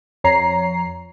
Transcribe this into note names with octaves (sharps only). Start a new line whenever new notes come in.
F2 C#5 A#5 C7